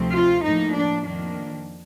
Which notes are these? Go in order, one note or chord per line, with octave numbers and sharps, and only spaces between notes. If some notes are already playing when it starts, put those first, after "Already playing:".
Already playing: D2 C3 F3 A3 C4
F4
A2 F3 A#3 D#4
D4
F2 D#3 A#3 D4